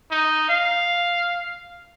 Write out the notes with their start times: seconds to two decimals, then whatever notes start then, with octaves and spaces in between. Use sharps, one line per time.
0.11 D#4
0.49 F5